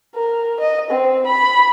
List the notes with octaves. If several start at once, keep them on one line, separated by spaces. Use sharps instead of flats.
A#4
D#5
C4
B5